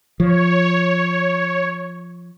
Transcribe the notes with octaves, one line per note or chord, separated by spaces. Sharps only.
F3 C#5